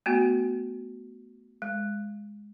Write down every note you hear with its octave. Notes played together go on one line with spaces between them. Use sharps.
A3 B3 F#4
G#3